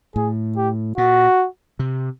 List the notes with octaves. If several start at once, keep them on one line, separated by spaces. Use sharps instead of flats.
A2 G#4
G4
A#2 F#4
C3